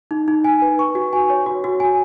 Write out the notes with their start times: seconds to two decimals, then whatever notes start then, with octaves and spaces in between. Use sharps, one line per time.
0.11 D#4
0.28 D#4
0.44 G#5
0.62 B4
0.79 C#6
0.95 F#4
1.13 G#5
1.30 C#5
1.46 F#4
1.64 F#4
1.80 G#5